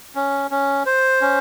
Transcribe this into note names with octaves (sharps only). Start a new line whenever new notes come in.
C#4
C#4
C5
C#4